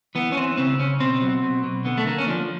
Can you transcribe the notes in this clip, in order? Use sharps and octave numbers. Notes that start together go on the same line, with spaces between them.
E3 B3
C#4
E3 C4
C#3 C4
C#3 C#4
B2 C4
F#3
B2
B2
D3 B3
A3
D3 A#3
C#4
F3 D4